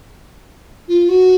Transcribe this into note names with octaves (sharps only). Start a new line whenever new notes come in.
F4
F#4